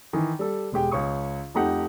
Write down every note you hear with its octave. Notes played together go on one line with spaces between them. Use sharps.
D#3 E3
G3 A4
E1 G#3 G4 G5
C#2 C#5 C#6 D#6
F2 A3 D#4 G4 F#5